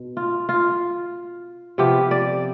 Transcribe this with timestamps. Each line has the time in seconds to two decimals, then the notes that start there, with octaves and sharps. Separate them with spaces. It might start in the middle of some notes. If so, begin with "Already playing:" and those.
Already playing: B2
0.17 F4
0.49 F4
1.78 C3 F3 B3 G4
2.11 D5